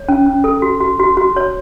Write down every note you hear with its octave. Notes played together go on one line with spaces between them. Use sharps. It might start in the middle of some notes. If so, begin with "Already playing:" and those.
Already playing: C#5
C#4
C#4
A4
F#4
F#4
F#4
F#4
C#5